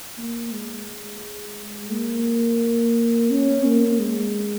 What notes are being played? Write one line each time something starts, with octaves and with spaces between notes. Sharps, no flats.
A#3
G#3
A#3
C#4
A#3
G#3